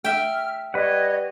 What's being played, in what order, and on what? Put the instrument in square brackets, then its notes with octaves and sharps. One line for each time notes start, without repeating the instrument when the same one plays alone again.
[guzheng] E5 G5 [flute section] F6
[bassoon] G3 [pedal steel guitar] B4 F#5 [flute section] C#5 D#5